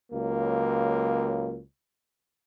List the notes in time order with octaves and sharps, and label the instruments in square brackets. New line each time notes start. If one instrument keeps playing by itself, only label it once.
[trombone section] C#2 F#3 A#3